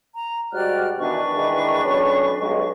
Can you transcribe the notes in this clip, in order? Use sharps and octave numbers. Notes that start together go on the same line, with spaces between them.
A#5
G#2 G3 F#4 D5 F6 F#6
B2 D#3 E3 D4 B4 C#6
D#3 E3 G#3
B1 C#4
B1 G2 G#3